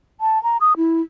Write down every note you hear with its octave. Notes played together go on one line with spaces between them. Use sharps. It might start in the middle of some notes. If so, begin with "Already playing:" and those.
A5
A#5
D#6
E4